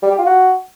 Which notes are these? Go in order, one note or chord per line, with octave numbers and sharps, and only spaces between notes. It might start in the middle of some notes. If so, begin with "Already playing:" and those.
G3
G4
F4
F#4